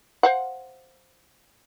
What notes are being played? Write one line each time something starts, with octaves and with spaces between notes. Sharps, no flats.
C5 F5 F#5